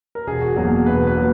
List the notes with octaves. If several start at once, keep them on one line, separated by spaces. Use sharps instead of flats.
A#4
E1 G#4
F#4
E2 B2 F#3 A#3 G#4
E1 B4
B4
F#3 A#3